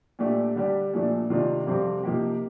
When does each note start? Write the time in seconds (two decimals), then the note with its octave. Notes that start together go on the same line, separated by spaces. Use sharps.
0.19 A#2 A3 D4 G4
0.55 D3 G3 D4 G4
0.94 A#2 F3 A3 D4
1.30 C3 D#3 A3 D4 F4
1.66 F2 C3 G3 C4
2.04 C3 F3 A#3 D#4 G4